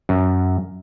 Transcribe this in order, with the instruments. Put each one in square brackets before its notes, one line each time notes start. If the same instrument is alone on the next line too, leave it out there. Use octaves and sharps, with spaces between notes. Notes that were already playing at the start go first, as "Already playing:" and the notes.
[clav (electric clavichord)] F#2